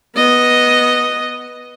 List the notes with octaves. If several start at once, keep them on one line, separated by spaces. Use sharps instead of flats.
B3 D#5